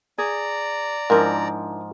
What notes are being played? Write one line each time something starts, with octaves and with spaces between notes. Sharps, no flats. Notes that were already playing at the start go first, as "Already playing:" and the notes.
G#4 D5 A#5
G#2 F3 D4 E4 A#4